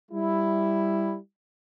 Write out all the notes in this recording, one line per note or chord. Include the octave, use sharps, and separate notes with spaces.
G3 E4